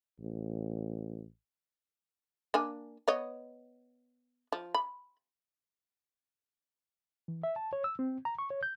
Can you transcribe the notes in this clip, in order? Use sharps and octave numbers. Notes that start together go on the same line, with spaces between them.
A1
A#3 D4 G#5
B3 C#5 D#5
F3
B5
E3
E5
A5
C#5
E6
C4
A#5
C#6
C#5
G6